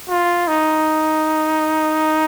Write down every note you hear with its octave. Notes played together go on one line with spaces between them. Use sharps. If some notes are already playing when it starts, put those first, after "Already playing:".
F4
D#4